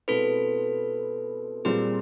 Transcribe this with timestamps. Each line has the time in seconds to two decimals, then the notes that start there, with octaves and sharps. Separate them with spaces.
0.08 B2 G#3 C4 E4 A4 B4
1.65 A#2 G3 C4 G#4 A#4